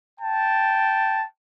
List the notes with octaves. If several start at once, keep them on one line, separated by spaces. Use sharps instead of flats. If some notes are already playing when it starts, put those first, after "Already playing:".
G5 A5